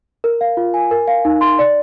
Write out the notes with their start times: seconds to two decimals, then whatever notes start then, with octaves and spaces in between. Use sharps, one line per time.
0.24 A#4
0.41 F5
0.57 F4
0.74 G#5
0.91 A#4
1.08 F5
1.25 D#4
1.41 C6
1.59 D5